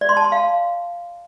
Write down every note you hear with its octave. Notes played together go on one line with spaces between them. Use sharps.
D5
C6
A5
C6
F5